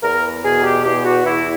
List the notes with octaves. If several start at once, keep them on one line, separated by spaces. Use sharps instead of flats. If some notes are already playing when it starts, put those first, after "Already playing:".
E2 A#4
B2 G#4
G4
E2 G4
F#4
E2 E4